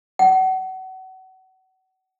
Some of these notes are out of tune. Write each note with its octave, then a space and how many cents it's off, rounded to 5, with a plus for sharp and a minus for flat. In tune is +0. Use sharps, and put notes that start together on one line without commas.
F#5 +30